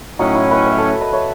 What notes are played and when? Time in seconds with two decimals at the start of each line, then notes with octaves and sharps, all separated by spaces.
0.19 A2 F#3 C#4 D#4 F#4
0.35 E4
0.51 B4 D#5
0.66 C#5 E5
0.78 A4 C#5
1.01 B4 D#5
1.13 C#5 E5